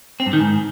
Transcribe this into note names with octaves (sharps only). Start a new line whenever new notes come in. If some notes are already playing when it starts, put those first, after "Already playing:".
C4
G2
D#3
G#2